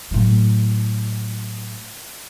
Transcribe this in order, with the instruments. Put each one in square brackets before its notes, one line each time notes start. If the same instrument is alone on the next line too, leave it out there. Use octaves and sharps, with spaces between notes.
[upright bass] A2 F#3